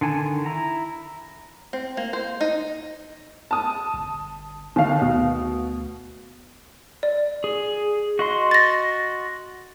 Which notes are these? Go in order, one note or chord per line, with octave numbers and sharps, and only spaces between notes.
D3 D#3 G#5 A5
E4 A#5
C4
A#3
C5
D#4
A5 D#6
G1
D#2 D3 F5
D2 B2
D5
G#4
F#4 D#5 C6
A6 A#6